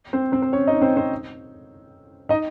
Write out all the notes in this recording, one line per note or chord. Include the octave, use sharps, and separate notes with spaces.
C4 C5
C4 C5
C5
C#4 C#5
D#4 D#5
C4 C5
C4 C5
D#4 D#5